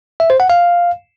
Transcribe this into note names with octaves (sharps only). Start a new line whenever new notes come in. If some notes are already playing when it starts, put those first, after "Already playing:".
E5
C5
F#5
F5